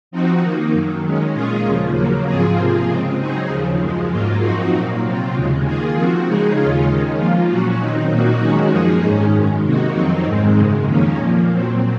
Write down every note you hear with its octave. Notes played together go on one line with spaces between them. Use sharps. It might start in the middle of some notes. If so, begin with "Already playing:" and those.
F3 C4 D#4 F#4
D#3 A#3 D#4
F#2 D#3 F#3
D#3 G#3 C#4
A#2 G#3 C#4 F4 G#4
D#2 C#3 F3
C#3 F#3 A#3
G#2 F3 C4 F4 G#4
C3 F3 A#3 F4 G#4
C#3 G#3 C4
C#3 F#3 C4 D#4 G#4
D#2 C#3 F3
F#2 F3 G#3
G#2 F#3 A#3 F4
F#2 F3 C4 D#4 F#4
A#2 F#3 A#3
C3 F#3 C4 F4
D#2 C#3 G#3
D#3 A#3 F4 G#4
F3 C4 F#4
C#3 G#3 D#4 G#4
D#2 C#3 G#3 C#4 F4
D#3 G#3 C#4
F3 A#3 F4
A#2 F#3 C#4 F#4
D#3 F#3 C4 D#4
A#2 F#3 A#3 D#4 F#4
D#3 G#3 C#4 F#4
F#2 F3 A#3 D#4 G#4
G#2 D#3 G#3 C#4
F#2 D#3 G#3
C3 D#3 A#3 D#4 F#4
F2 D#3 F#3 C4 D#4
G#2 D#3 G#3 C4
F#2 C#3 G#3
F2 D#3 A#3 C#4
A#2 F3 A#3
A#2 F#3 C4